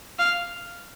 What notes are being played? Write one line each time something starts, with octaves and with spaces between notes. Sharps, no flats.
F5